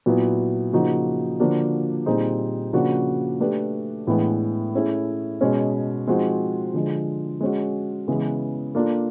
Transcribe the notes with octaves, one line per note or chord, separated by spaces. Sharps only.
A#2 F#3 B3 E4
C#3 F3 A#3 D#4 F#4
D3 F3 A#3 D4 F#4
A#2 G3 C4 D#4 G#4
C#3 F3 A#3 D4 F#4
A3 D4 G4 B4
A2 E3 G#3 B3 D4
A3 C#4 E4 G#4
B2 G#3 C#4
F3 G#3 C4 D#4 F#4
D3 F3 G#3
G#3 C#4 F#4
C#3 E3 G#3 B3
A#3 D4 F4 A4